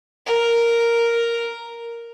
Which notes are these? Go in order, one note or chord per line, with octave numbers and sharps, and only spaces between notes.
A#4